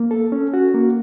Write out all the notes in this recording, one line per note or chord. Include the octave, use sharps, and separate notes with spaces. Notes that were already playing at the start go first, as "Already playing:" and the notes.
Already playing: A#3
A4
C#4
F#4
A#3